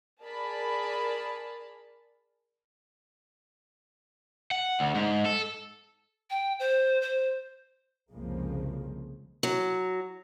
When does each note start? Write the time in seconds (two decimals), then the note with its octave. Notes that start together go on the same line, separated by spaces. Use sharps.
0.23 G#4 A#4 D5 A5 B5
4.51 F#5
4.80 D2
4.95 G#2
5.26 A4
6.30 G5
6.59 C5
7.01 C5
8.13 C2 F2 C#3 F3 G#3 A#3
9.43 F#3